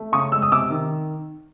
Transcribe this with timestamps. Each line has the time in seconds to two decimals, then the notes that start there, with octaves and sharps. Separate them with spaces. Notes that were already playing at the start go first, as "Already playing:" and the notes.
Already playing: A3
0.12 C#3 C#6 D#6
0.32 G#3 E6
0.42 D#6
0.51 C3 D6 E6
0.70 D#3